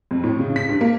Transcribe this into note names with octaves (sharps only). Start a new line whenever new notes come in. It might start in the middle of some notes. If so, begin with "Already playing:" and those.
F2
A2
C#3
B6
G2
A#3